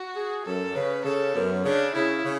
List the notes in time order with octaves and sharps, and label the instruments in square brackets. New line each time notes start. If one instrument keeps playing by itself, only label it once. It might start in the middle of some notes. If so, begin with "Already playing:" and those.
Already playing: [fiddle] F#4
[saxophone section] G#4
[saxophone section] F#2 [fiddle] A4
[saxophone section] C#3 [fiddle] B4
[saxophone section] C#3 [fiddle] A4
[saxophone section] F#2 [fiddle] B3
[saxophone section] C#3 [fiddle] D4
[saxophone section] C#3 [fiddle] E4
[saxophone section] C#3